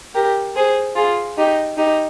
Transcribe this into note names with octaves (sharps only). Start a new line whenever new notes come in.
G4 A#4
G#4 C5
F4 G#4
D#4 G4
D#4 G4